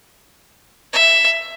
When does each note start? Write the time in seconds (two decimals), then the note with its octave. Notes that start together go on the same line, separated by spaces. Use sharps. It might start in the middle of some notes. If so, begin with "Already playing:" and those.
0.93 E5